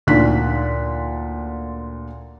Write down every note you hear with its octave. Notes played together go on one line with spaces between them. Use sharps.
D2 A#2 D#4 F#6 B6